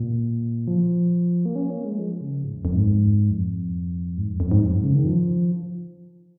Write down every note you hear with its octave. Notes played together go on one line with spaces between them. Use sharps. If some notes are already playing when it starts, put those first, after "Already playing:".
Already playing: A#2
F3
A#3
C#4
A#3
G#3
F3
C#3
G#2
F2
F2
G#2
F2
G#2
F2
F2
G#2
F2
G#2
C#3
D#3
F3